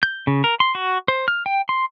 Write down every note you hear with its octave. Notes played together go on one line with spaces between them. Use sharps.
G6
C#3
A#4
C6
F#4
C5
F6
G5
C6